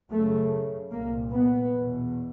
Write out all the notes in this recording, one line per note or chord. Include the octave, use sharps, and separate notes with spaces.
F#2 C#3 A3
C2 A#2 A#3
B3
E2 B2